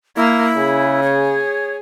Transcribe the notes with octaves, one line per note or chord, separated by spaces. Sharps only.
A#3 E4
C#3 G#4
C#5